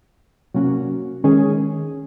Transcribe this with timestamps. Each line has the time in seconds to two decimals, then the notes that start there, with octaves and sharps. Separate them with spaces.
0.54 C3 F#3 A#3 C#4 F#4
1.24 D#3 G#3 C#4 G#4